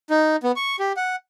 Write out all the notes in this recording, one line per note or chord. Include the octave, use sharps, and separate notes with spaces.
D#4
B3
C#6
G4
F#5